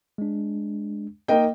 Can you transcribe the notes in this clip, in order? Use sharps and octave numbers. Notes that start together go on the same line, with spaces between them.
G#3 D4
A#3 D#4 D#5 G5